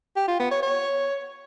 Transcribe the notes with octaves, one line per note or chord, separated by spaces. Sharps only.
G4
F4
B3
C#5
C#5